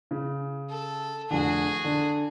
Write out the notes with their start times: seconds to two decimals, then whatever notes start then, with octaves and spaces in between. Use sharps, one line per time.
0.11 C#3
0.70 A4
1.30 F1 D3 F#4 G#4
1.84 D3